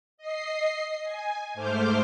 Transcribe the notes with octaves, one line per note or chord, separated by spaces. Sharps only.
D#5 C7
G#5
G#2 A3 C5 D6 F6 G6